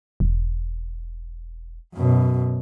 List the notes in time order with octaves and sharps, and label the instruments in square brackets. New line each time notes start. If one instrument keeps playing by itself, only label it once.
[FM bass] E1
[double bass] F#2 B2